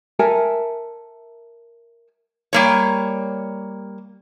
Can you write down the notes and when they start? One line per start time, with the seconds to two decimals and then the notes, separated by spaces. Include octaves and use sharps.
0.19 A4 A#4 E5 G#5
2.53 G3 A#3 C#5